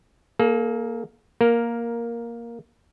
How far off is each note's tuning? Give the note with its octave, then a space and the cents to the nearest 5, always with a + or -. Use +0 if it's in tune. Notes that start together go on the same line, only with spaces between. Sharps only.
A#3 +0 A4 -45
A#3 +5 A#4 +0